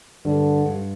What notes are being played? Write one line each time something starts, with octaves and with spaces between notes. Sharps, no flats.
G2 D3
G2